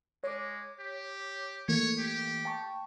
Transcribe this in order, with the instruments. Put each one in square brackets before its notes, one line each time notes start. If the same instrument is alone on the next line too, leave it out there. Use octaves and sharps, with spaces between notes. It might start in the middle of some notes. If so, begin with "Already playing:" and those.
[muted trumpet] G#3 [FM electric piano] C#5 D6
[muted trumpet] G4
[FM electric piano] E3 A3 A#3 [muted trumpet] C#5
[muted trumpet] G4
[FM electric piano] G5 A5 C#6